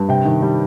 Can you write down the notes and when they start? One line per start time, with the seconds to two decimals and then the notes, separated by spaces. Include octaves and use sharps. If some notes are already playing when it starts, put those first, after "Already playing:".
Already playing: G2
0.08 C3 G5
0.25 D#3
0.42 G3